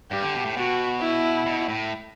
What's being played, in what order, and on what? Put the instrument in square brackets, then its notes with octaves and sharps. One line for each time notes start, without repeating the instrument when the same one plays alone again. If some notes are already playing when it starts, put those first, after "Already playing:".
[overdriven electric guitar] G2 [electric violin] G4
[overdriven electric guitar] D3
B2
A2
[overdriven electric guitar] B2 [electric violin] F#4
[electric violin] E4
[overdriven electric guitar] B2
A2